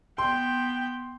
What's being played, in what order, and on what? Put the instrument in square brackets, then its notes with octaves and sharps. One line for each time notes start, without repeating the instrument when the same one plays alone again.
[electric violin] B3 G5 [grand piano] C6